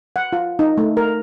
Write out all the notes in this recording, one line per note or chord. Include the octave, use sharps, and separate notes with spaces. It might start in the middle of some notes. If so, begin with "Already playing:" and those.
F#5
F4
D#4
A3
A#4